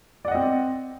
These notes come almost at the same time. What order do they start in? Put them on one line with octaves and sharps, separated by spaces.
D5 F#5 D#5 C4